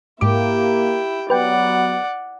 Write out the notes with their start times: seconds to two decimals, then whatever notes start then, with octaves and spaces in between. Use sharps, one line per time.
0.21 G#2 A#3 E4 G4 G5 D6
1.30 F#3 B3 B4 D5 F#5 G5